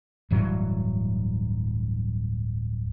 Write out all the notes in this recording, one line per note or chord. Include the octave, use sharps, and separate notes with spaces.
D1 G2 E3 F#3